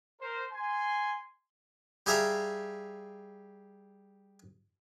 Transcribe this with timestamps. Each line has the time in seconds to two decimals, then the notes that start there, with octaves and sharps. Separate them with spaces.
0.22 A#4 C5
0.52 G#5 C6
2.06 G3 G4 G#4 E5 F5 A#5